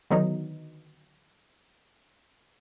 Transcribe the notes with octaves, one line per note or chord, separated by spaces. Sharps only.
D3 D#3 F#3 B3 D#4